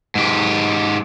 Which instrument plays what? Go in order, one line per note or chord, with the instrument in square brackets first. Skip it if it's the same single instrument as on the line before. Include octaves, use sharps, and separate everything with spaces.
[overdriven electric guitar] G#2 G4